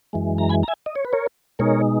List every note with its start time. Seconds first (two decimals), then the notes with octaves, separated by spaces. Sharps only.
0.13 F#2 E3 G#3
0.38 A#5
0.50 G#5 B5
0.63 A#5
0.68 E5 G#5
0.86 D#5
0.96 C#5
1.05 B4
1.13 A#4 C#5
1.59 B2 G#3 D#4 A#4 C#5